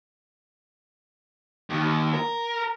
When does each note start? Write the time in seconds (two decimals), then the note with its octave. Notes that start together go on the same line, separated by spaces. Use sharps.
1.70 D#2
2.14 A#4